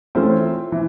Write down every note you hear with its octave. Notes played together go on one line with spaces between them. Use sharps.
E3 A3 C4 C#4 F4 C5
E3